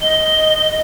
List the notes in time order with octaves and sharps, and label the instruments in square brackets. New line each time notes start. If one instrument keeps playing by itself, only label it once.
[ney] D#5 [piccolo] G7